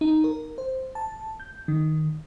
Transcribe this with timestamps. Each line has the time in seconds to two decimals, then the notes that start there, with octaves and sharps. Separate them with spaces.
0.01 D#4
0.24 A#4
0.58 C5
0.95 A5
1.40 G6
1.68 D#3